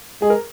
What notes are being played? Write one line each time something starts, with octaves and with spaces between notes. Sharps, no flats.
G#3 G#4
A#4